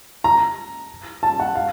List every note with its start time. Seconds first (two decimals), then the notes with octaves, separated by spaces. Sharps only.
0.24 A#5
1.23 A5
1.40 F#5
1.55 F5